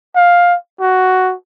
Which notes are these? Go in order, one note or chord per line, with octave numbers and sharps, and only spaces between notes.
F5
F#4